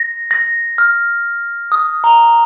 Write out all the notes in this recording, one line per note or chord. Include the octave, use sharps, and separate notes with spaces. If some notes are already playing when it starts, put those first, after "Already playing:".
Already playing: A#6
A#6
F6
D#6
A#5